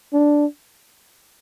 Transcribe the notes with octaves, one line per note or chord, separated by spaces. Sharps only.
D4